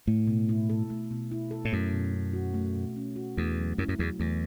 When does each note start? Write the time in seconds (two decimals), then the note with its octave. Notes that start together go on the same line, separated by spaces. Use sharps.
0.07 A2 A3
0.27 B2
0.49 E4
0.70 A4
0.90 A3
1.11 B2
1.31 E4
1.51 A4
1.65 A2
1.72 F#2 A3
1.92 B2
2.14 C#4
2.33 F#4
2.54 A3
2.75 B2
2.96 C#4
3.16 F#4
3.37 E2 A3
3.57 F#3
3.78 F#2 E4
3.88 F#2
3.99 E2 F#3
4.19 E2 A3